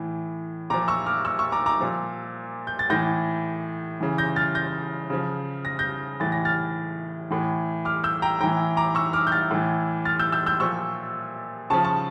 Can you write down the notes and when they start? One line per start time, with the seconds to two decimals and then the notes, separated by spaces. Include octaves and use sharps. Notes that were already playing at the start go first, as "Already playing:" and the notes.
Already playing: A2 E3
0.70 A#2 F3 A#5 D6
0.88 C#6 E6
1.06 D6 F6
1.25 C#6 E6
1.39 C#6 E6
1.52 A#5 D6
1.66 A#5 D6
1.80 A#2 F3
2.67 G6
2.79 A6
2.90 A2 E3 G6 A#6
4.01 C#3 E3
4.18 G6 A#6
4.36 F6 A6
4.55 G6 A#6
5.10 C#3 F3
5.65 A#6
5.79 G6 A#6
6.20 A2 E3 A6
6.32 A#6
6.45 F6 A6
7.31 A2 E3
7.85 D6 F6
8.04 E6 G6
8.22 G5 A#5
8.40 A2 E3 G5 A#5
8.77 A#5 D6
8.95 C#6 E6
9.13 D6 F6
9.27 G6
9.32 F6 A6
9.51 A2 E3
10.05 F6 A6
10.19 E6 G6
10.32 E6 G6
10.46 E6 G6
10.60 A#2 F3 C#6 E6
11.70 C#3 F3 A5 C#6
11.84 A5 C#6